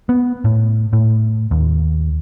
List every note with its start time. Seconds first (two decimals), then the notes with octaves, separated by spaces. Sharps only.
0.09 B3
0.44 A2
0.93 A2
1.51 D#2